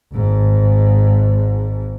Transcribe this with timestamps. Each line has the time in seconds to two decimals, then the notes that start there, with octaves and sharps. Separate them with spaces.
0.13 G#1 G#2